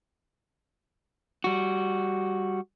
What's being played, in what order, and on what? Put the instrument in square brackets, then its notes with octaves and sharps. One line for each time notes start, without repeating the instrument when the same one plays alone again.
[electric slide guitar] G3 F#4